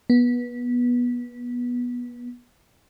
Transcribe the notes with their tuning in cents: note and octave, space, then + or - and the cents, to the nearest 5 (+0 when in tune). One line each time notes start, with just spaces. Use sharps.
B3 -20